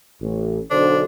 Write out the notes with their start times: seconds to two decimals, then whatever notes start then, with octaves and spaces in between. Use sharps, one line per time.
0.21 A1
0.70 B1 D3 D4 C5